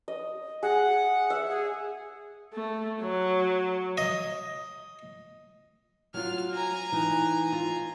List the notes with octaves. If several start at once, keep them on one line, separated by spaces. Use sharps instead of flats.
D#5
G#4 F#5
E5
G#4
A3
F#3
D#5
F#3 F4 F6
G#5 A#5
E3 D#4
F4